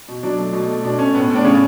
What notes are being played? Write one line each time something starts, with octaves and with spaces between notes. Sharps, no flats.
B2
F#3 D4
A3
B2
A3
B2 D4
A3 C#4
A2 B3
A2
D4
C#3 C#4